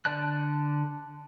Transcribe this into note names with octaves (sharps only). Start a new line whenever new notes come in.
D3 D5 A5 F#6